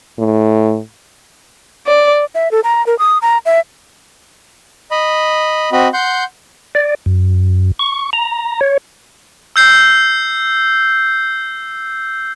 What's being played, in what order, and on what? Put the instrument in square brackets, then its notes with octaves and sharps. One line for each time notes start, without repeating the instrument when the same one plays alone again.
[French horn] A2
[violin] D5
[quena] E5
A4
A#5
A#4
D#6
A#5
E5
[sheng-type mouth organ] D#5 B5
C4 F#4 D#5 B5
F#5 C6 G6
[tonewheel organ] D5
F#2
C#6
A#5
C#5
[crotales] E6 G6 C7